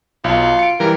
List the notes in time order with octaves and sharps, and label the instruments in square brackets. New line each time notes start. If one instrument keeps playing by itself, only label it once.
[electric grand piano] B1 A5 [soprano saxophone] F4
[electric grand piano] C#7 D7
[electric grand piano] E3 G3 [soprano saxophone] A#4